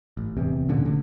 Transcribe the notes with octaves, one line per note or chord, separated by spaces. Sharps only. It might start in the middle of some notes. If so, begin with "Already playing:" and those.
A1
D1 E2 C3
A#2 D3 C#4
D1 D2 D3